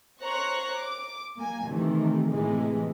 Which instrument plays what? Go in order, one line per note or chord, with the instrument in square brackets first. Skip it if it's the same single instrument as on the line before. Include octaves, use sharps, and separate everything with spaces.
[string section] C5 C#5 A#5 C#6 F#6
D6
A#3 G#5
C3 D#3 E3 A3
A2 C3 E3 G#3